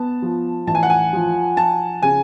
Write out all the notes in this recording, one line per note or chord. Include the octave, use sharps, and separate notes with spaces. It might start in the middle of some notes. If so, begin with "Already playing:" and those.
Already playing: B3 A5
F3
A1 A5
G#5
F#5
G#5
F3
F3 A5
C#3 G#5